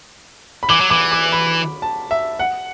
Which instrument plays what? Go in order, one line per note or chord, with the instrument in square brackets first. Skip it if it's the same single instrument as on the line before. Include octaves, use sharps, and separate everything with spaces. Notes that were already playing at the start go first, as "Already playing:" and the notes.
[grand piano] B5
[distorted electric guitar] E3 [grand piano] D6
[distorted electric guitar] F#3
[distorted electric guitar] E3 [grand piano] D6
[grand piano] D6
B5
A5
E5
F#5